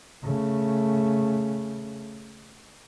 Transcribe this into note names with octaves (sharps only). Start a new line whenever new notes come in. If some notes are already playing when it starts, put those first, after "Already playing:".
C#3 A3